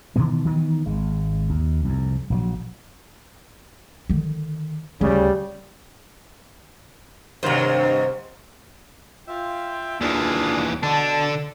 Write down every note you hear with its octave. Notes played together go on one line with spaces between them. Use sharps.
B2 D#3 E3 B3
D#3 E3 G3 B3
G#1 G#3
D#2
C2 F2
A#1 E3 F#3
D3 D#3
D2 C#3 G3
G2 C3 D#3 F#3 C5
F4 E5 G5
D#2 E3 D4 F4 G#4
B2 D3 D4 A5